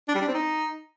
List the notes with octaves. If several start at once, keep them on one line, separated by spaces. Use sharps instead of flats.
D4
G3
D4
C4
D#4